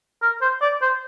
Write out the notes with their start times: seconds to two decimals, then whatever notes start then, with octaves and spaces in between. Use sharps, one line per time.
0.22 A#4
0.41 C5
0.61 D5
0.82 C5